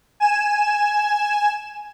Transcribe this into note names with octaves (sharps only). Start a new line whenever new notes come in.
G#5 E7